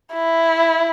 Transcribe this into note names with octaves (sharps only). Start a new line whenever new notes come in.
E4